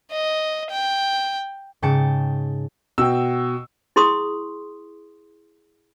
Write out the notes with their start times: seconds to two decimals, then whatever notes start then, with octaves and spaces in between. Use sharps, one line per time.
0.11 D#5
0.70 G5
1.82 G#2 C#3 G5 A5 C#7
2.98 B2 G5 E6
3.96 E4 G#4 C6 C#6 D#6